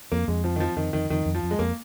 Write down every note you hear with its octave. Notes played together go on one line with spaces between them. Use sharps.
F2 A#3
F2 G#3
F3 C4
D#3
F3 C4
F2 D#3
F2 D#3
F2 D#3
F2
F3
F2
G#3
F2 A#3